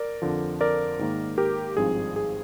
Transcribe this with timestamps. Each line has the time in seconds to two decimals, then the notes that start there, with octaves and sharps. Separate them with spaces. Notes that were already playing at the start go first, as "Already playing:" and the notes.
Already playing: A#4 D5
0.22 F2 D3 F3
0.61 A#4 D5
0.99 G#2 D#3 A#3
1.38 G4 A#4
1.77 G#1 G2 F3 C4 D#4 G#4
2.16 G#4